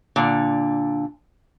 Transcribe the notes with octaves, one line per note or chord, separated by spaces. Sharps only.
A#2 D3